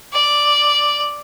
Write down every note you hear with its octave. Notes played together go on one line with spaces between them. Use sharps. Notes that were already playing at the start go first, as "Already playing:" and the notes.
D5